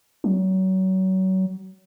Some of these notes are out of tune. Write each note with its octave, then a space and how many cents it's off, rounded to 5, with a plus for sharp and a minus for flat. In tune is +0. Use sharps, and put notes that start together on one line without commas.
F#3 +30